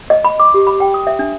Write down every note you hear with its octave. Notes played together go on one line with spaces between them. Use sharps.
D#5
B5
D6
G4
B5
G5
D#6
E5
D4